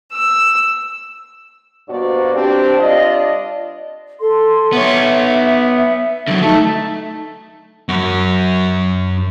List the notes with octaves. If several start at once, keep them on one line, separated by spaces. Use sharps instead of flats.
E6
G2 B2 A#3 F#4 C5 D5
C4 D4 G4
G3 D4 F4 D5 D#5
A4 C6
B3 C#5 E5
D3 F#3
A3 D#4 E5 A5
F#2 F#4